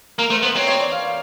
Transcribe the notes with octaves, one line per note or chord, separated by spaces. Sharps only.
A#3 A#4
A3 C5
B3 C5
C4 C#5
C#5
D5
F5
F5